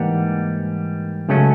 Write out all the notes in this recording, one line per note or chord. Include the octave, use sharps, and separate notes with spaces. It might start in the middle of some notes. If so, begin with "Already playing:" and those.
Already playing: G#2 E3 G3 A#3 F#5
C#2 C#3 F#3 A3 C#4